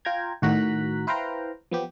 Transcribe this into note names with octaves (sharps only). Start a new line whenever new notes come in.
F4 G5 A#5 G#6
A2 D#3 F#4 A#5 F#6 B6
E4 B4 C5 F5 G5 A#5
F3 B3 G4